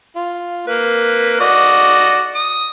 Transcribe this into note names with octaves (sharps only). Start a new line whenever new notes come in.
F4
A#3 B4
F#4 D5 D#5
D#6